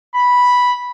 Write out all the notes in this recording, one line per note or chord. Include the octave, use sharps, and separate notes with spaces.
B5